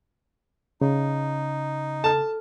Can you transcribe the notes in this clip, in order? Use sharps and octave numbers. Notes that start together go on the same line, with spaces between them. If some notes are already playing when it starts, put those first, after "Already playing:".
C#3 D#4
A4 A5 F6